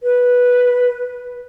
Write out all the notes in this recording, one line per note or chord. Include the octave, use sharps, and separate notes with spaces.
B4